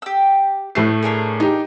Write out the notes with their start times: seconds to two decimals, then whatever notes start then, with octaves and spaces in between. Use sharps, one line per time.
0.02 G4 E6
0.75 A2 A3 C7
1.03 D4 G#4 A#4
1.40 D#4 G4